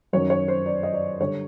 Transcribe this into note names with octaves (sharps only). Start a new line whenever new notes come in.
F#2 D#3 F#3 C#5
C#5
C5
D5
D#5
D5
D3 G3 C#5